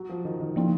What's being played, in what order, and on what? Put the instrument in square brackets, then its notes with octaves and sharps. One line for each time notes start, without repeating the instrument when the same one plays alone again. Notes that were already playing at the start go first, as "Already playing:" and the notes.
Already playing: [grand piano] F#3
F3
D#3
D#3
[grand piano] C#3 [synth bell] F3 A#3 D#4